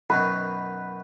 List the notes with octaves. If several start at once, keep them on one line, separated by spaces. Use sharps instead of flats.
F#2 B2 D#3 B4